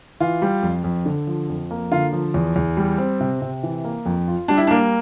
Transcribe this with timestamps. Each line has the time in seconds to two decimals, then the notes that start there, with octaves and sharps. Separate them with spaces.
0.20 E3 F4
0.42 G3
0.63 F2
0.84 F2
1.06 D3
1.27 F3
1.49 F2
1.71 A#3
1.91 D3 F4
2.13 F3
2.34 E2
2.56 E2
2.77 G3
2.98 C4
3.20 C3
3.42 C3
3.63 E3
3.84 A#3
4.06 F2
4.28 F4
4.48 G3 D4
4.57 E4
4.67 D4
4.71 A#3